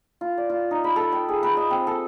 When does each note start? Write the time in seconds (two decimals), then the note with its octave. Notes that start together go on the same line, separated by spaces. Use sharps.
0.21 F4
0.38 D5
0.50 F4
0.71 D#4
0.84 B5
0.96 A4
1.12 G5
1.29 G#4
1.43 B4
1.57 D#5
1.70 C4
1.87 A4